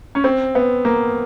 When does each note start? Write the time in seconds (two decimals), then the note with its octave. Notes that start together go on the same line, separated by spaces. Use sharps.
0.15 C#4
0.24 C4
0.55 B3
0.85 A#3